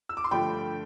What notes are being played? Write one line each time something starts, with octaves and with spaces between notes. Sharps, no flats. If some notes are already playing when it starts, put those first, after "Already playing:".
E6
D6
C6
G2 D3 F3 A3 G5 B5